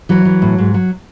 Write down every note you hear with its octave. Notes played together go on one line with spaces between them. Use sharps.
E3 F#3
E3
A2
G#2
F#3